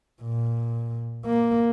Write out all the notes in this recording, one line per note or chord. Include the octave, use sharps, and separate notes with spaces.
A#2
A#3